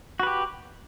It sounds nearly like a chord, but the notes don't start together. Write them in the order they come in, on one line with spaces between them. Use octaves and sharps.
F#4 B4 G4